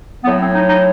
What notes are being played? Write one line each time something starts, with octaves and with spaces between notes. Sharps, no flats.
A2 F#3 B3
C4
D#4
D#4